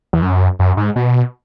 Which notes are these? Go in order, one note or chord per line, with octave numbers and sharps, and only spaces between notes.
E2
F#2
F#2
G#2
B2